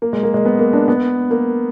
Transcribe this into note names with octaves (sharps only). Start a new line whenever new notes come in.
A#3
G#3
A#3
G#3
B3
A#3
D4
B3
A#3